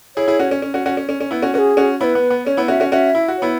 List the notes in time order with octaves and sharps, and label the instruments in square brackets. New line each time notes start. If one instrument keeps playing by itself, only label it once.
[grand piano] E4 G#4 [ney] C#5
[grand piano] E4 G#4
C#4 F#4
C#4
C#4
C#4 F#4
C#4 F#4
C#4
C#4
C#4
B3 E4
C#4 F#4
[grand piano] C#4 F#4 [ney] G#4 B4
[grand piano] C#4 F#4
[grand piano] B3 E4 [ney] B4 C#5
[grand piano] B3
B3
[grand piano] C#4 [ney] C#5
[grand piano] B3 E4
[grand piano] C#4 F#4 [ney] E5
[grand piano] C#4 F#4
[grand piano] C#4 F#4 [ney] E5
[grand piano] E4
F#4
[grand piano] B3 E4 [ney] C#5